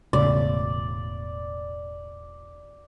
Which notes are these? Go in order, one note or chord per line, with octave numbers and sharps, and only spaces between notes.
E1 A2 C#3 D5